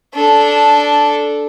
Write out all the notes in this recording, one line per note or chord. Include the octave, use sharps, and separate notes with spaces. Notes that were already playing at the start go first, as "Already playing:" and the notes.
D4 A4